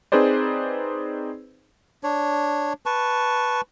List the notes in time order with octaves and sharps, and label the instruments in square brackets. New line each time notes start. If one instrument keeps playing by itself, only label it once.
[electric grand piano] C4 D#4 G#4 B4 C5 D5
[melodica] D4 C#5
B4 A5 C#6